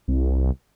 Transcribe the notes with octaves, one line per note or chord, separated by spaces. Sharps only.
C2